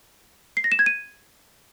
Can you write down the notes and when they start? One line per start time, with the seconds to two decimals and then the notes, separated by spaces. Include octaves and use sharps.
0.57 C7
0.64 A#6
0.72 E7
0.79 G#6
0.86 D#7